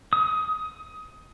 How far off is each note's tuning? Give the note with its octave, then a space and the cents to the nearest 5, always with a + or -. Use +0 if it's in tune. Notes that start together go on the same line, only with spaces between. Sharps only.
D#6 +20